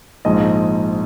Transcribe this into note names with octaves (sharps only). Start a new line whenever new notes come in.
A#1 G#2 F3 G#3 D#5